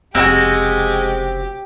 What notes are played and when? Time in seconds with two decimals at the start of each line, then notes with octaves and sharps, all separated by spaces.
0.15 F1 C#3 G#3 C4 E4 F#4 G4